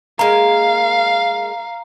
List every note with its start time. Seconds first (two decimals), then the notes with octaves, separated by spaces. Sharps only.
0.19 G#3 A#3 F5 A#5